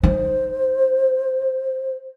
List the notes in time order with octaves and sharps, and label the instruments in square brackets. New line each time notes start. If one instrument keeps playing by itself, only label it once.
[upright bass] D#4 [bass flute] C5